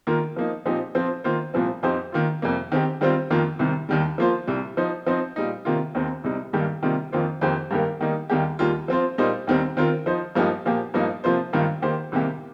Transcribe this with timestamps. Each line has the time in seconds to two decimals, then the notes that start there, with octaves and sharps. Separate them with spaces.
0.07 D#3 A#3 F4 A#4
0.36 F3 A#3 D#4
0.66 A#2 F3 C4 D#4 G4
0.95 F3 C4 F4 C5
1.24 D#3 A#3 F4 C5
1.54 C2 A#2 F3 C4
1.83 F2 F3 D#4 G4 C5
2.13 D#3 A#3 F4
2.42 F2 C3 G3 A#3
2.72 D#3 C4 G4
3.01 D#3 G3 C4 F4 C5
3.30 F2 D#3 A#3 F4
3.59 C2 C3 D#3
3.89 D#2 D#3 G3
4.18 F3 A#3 F4 C5
4.47 C2 C3 G3
4.77 F3 D#4 C5
5.06 F3 C4 D#4 C5
5.36 A#2 G3 D#4
5.65 C3 D#3 A#3 F4
5.95 D#2 D#3 C4
6.24 C2 C3 G3 D#4
6.53 G2 D#3 G3 A#3 G4
6.83 C3 D#3 G3 A#3 F4
7.12 F2 D#3 A#3 F4 C5
7.41 F2 D#3 A#3 G4 C5
7.71 G2 D#3 A#3 G4 A#4
8.01 D#3 G3 A#3 D#4
8.30 D#2 D#3 G3 A#3 G4
8.59 D#2 D#3 G3 A#3 F4
8.88 F3 C4 F4 C5
9.18 A#2 G3 A#3 D#4 C5
9.47 D#2 D#3 G3 C4
9.77 D#3 C4 F4 A#4
10.06 F3 D#4 C5
10.35 G2 F3 A#3 D#4 G4
10.66 A#2 F3 A#3 G4
10.94 G2 F3 A#3 D#4
11.24 C3 F3 A#3 F4 C5
11.53 G2 D#3 A#3 F4
11.82 D#3 A#3 G4 C5
12.12 C2 C3 D#3 A#3 G4